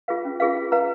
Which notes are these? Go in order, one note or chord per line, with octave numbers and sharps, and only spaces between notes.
F4 G#4 B4 F5
C#4
F4 G#4 B4 F5
F4
B4 F5 A#5